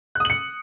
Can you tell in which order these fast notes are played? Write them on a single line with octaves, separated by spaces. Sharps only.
F#6 D#6 F#7 C#7